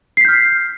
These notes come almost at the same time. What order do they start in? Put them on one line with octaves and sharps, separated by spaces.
C7 B6 G6 F6